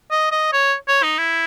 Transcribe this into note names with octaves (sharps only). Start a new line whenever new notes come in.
D#5
D#5
C#5
C#5
D#4
E4